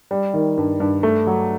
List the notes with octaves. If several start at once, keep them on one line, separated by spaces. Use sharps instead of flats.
G3
D#3
G2
G2
A3
F#3